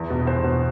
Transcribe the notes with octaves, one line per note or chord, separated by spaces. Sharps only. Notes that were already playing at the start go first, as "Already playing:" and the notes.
Already playing: E2
B2
E2 C5
B2